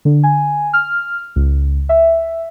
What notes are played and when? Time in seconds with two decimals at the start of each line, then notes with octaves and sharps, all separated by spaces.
0.05 D3
0.23 G#5
0.73 F6
1.36 C#2
1.89 E5